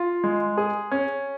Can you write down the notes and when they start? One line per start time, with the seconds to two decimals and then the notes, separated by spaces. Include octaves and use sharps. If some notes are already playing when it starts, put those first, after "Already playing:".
Already playing: F4
0.24 G#3
0.57 G#4
0.91 C#4